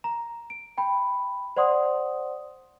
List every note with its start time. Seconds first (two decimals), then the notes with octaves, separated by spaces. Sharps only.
0.04 A#5
0.50 D7
0.78 G5 B5
1.57 C5 D5 F#5 C6 D#6